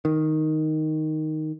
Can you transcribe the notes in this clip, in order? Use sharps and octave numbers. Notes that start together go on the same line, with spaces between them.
D#3